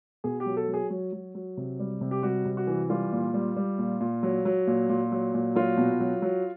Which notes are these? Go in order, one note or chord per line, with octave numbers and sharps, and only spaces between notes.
B2 G#4
G4
F#3
A4
F#3
G#4
F#3
F#3
F#3
C3
G3
C3
G4
G3 F#4
C3
F#4
E3
G3 F4
A#2
G3
G3
A#2
A#2
F#3
F#3
A#2
A#2
F#3
A#2
F#3 F4
B2
F#3
F#3